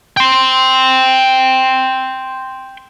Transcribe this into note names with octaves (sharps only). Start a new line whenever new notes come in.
G5 C6